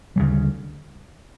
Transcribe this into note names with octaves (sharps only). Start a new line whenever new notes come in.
D2 C#3 E3 G3